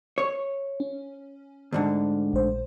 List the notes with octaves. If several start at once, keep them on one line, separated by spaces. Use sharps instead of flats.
C#5
C#4
D2 G#2 D3
A#1 C5